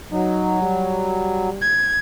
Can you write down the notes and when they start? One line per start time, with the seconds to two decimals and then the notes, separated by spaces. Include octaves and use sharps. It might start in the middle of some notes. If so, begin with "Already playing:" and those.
0.12 F#3 D#4
0.62 G3
1.61 G#6